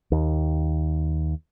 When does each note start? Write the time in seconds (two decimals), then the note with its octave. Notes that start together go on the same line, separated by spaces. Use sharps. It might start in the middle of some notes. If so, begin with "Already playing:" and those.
0.12 D#2